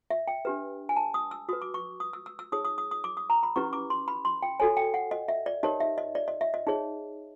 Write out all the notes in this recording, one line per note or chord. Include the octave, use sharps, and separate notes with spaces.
E5
G5
D4 G4 B4
G#5
A5
D#6
E6
F#4 B4 D#6
D6
C#6
D#6
E6
E6
E6
D#4 G#4 C#5 D#6
D#6
D#6
D#6
D6
D#6
A#5
B5
C#4 E4 G4 B4 C#6
D6
C6
B5
C6
G5
F#4 A4 C#5 G#5
G5
F#5
D#5
E5
D5
D#4 G4 A#4 C#5 D#5
E5
D#5
D5
D#5
E5
D#5
D#4 G#4 C#5